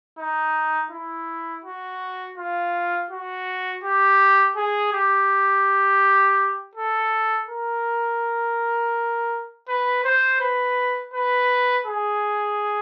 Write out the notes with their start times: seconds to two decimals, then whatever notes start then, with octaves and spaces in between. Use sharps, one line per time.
0.18 D#4
0.91 E4
1.64 F#4
2.37 F4
3.11 F#4
3.84 G4
4.56 G#4
4.93 G4
6.75 A4
7.49 A#4
9.68 B4
10.04 C5
10.41 B4
11.13 B4
11.86 G#4